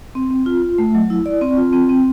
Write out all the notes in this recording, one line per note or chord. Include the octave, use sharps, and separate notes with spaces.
C4
C4
F4
F4
A3
F#3
E4
D5
C4
F4
C4
C4